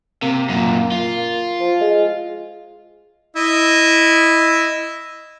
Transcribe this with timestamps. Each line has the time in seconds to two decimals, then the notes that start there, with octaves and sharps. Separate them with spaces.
0.22 C3 A#3
0.49 F#2 A#2
0.92 F4
1.60 F3
1.81 G#3
3.36 E4 D#5